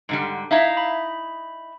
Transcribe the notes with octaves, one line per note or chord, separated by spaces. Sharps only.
G#2 D3 G3
D#4 E4 E5 F5 A#5
B5